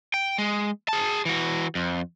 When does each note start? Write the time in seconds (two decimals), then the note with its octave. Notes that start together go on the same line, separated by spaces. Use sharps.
0.14 G5
0.38 G#3
0.89 G#4 A5
1.25 E3 F#4
1.75 F2